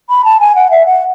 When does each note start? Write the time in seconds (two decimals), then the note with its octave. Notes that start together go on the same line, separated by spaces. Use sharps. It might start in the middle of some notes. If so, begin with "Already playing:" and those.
0.10 B5
0.25 A5
0.40 G#5
0.55 F#5
0.71 E5
0.86 F#5